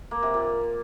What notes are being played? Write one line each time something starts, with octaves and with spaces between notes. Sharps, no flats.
A#3
C3
A#2